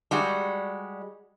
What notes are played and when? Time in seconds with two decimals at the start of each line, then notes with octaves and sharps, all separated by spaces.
0.11 G3 G#3 F#4